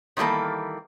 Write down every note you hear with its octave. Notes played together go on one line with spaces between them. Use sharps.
D#3 E3 G3 A#3 A4